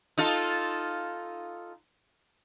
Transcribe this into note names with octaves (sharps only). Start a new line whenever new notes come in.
D#4 F4 A4